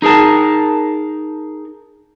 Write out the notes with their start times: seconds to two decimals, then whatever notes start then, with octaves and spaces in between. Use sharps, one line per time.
0.02 D#4 G#4 A#4 A5